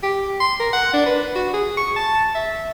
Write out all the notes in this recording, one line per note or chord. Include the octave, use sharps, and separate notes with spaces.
G4
C6
A#4
F#5
D4
B4
F#4
G#4
C#6
A5
E5